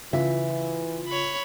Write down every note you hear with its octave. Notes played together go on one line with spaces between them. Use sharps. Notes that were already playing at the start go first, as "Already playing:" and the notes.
C#3 E3 F4 E5
C#5 B5